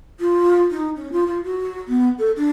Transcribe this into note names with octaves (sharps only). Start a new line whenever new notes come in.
F4
D#4
C#4
F4
F4
F#4
B3
A4
D4